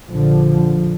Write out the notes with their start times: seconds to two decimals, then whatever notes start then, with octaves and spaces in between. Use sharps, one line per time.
0.10 A#1 D3 F3